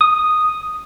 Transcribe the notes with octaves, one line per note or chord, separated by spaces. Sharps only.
D#6